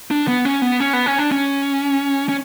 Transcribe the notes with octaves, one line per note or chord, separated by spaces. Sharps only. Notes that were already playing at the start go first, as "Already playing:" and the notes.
D4
B3
C#4
B3
C#4
B3
C#4
D4
C#4
C#4